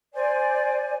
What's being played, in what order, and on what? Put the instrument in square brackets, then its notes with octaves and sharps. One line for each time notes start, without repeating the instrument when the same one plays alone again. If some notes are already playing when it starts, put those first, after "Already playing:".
[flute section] C5 D5 G#5